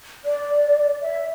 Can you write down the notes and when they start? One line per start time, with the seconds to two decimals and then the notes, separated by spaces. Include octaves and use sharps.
0.25 D5
1.01 E5